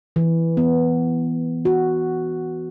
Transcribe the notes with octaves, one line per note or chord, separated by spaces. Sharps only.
E3
B3
F#4